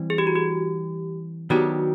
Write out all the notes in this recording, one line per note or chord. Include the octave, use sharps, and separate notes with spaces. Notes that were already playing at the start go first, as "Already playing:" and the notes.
Already playing: E3 G3 C4
G#4
G4
F#4
G4
D#3 F#3 B3 D4 F#4 G4